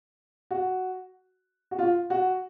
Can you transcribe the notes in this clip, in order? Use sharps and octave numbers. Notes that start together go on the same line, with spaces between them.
F#4
F#4
F4
F#4